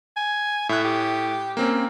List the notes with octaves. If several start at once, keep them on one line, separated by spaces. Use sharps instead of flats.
G#5
A2 E5 F#6
G4
A#3 C4 C#4